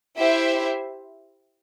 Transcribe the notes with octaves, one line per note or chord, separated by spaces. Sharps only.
E4 G4 C5 E5